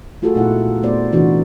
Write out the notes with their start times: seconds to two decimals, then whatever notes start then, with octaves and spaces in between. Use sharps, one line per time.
0.22 A3 F4 F#4 G#4 A4
0.35 A#2 A3 B3 D#4 E4 F#5
0.82 A3 B3 C5 D5
1.12 C3 E3 D4 D#4 F#4